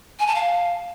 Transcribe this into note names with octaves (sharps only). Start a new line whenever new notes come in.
G#5
A5
F5